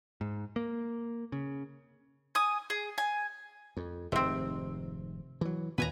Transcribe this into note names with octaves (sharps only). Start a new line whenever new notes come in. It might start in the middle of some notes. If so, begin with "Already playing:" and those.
G#2
A#3
C#3
G#5 D#6
G#4
G#5
F2
F1 G#2 C3 D#3 C4
E3 F#3
D#2 A#2 B4 G#5 A#5